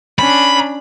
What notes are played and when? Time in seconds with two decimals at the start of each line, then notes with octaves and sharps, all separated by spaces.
0.19 C#4 D4 B5